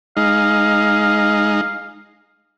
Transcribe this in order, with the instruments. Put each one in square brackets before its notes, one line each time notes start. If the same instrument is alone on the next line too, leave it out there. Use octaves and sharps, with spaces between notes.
[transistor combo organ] G#3 D#4 [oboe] F5